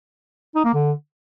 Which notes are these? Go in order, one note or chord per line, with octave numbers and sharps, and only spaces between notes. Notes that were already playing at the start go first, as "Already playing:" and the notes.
D#4
A#3
D3